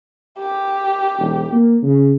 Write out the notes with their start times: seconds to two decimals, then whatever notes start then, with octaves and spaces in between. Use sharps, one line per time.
0.39 G4
1.19 E1
1.52 A#3
1.82 C#3